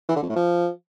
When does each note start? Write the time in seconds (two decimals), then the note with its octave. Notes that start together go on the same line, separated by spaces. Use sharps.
0.09 E3
0.16 D3
0.22 F2
0.29 A2
0.36 F3